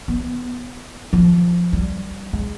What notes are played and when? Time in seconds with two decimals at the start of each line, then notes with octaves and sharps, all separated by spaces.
0.08 B3
1.13 F3
1.73 G3
2.33 G#3